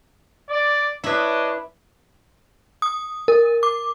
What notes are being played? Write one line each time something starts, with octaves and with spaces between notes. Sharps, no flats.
D5
D4 E4 B4 C#5 D#5
D#6
A#4
D6